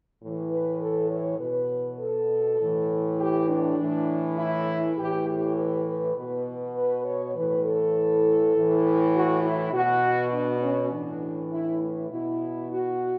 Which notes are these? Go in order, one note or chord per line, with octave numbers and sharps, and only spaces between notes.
A2 E3
B4
A4
C#5
B2 B4
A4
A2 E3
G4
D4
A2 E3
E4
A2 E3 G4
G4
B4
B4
B2 B4
B4
C#5
A2 E3 B4
A4
A2 E3
F#4
E4
B2 F#4
D4
C#4
A2 E3 D4
E4
A3
B2 E4
F#4